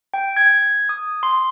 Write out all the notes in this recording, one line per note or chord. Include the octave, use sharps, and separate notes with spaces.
G5
G#6
D#6
C6